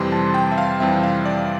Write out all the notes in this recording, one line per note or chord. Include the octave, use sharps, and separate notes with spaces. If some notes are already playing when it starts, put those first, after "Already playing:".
Already playing: F2 C3 E3 G3 C4 C6
A5
G5
E5
F5
F2 C3 E3 G3 C4 E5
F5
D5